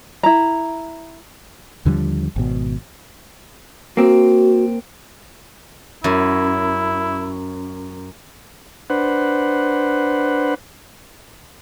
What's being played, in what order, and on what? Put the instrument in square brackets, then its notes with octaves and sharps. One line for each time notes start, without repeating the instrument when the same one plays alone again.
[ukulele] E4 A#5
[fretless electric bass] D#2 D3 F3 G3
G#1 B2
[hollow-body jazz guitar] A#3 C4 [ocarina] F#4
[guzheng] F#2 [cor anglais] E4
[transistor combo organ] D4 B4 C5 F#5